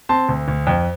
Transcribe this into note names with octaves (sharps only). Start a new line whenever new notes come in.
C4 A5 C6
D2
D2
F2